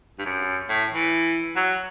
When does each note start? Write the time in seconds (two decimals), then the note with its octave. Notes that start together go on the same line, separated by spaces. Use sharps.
0.19 G2
0.26 F#2
0.69 A2
0.91 E3
1.56 F#3